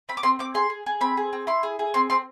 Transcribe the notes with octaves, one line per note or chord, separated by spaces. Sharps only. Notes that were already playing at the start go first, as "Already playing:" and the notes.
C4 B5
D6
C4 C6
C4 D6
G#4 C6
G#4
G#4
C4 B5
G#4
C4
E4 C6
G#4
G#4
C4 C6
C4 C6